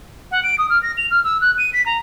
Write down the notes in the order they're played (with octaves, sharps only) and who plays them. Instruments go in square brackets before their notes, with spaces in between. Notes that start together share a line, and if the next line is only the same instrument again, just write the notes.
[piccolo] F#5
D7
D#6
F6
A#6
F7
F6
E6
F#6
D#7
B6
A#5